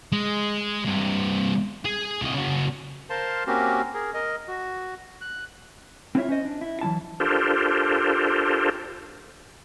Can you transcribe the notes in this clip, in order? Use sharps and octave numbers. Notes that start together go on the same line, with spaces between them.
G#3
G2 C3
G#4
C2 D#5
C#3 F#4
A#4 C5 F5 A5 C6
A#3 C4 C#4 F#4 G4 A#4
G#4 A#4
A#4 D#5
F#4
F#6
C4 E4 F4 B4 C#5 E5
C#4 C5 D#5
D4
E4
E3 F#3 E4 A5
D4 F4 G4 A4 A#4 C5